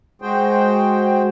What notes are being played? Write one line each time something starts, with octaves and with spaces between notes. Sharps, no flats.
G#3 F#4 G#4 C5 G5